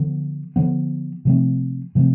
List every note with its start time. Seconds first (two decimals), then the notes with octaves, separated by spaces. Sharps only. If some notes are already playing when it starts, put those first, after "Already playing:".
Already playing: D3 F3 B3
0.56 D3 F3 B3
1.25 C3 F3 A3 C4
1.95 C3 F3 A3 C4